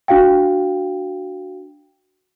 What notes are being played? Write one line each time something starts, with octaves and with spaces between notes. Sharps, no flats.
D4 F#4 F5 G5